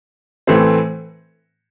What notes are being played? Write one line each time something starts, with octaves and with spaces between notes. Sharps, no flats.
A2 E3 A3 C4